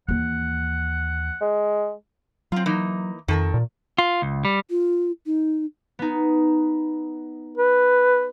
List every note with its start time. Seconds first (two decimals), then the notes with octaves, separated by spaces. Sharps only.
0.08 D#2 E3 F#5
1.41 G#3
2.52 F#3 C4 F4
2.66 E3 A#3 D#4
3.28 F2 D#3 A4 A#4
3.54 A#2
3.98 F4
4.22 C#2
4.45 G3
4.70 F4
5.26 D#4
5.99 B3 D#4
7.57 B4